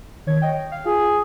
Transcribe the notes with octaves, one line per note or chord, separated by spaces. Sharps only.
D#3 C#5 G#6
C#5 D#5 G5
F5
F4 G#4